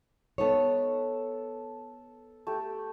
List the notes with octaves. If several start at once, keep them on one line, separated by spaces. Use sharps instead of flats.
B3 D#4 A4 C#5 E6
A3 G4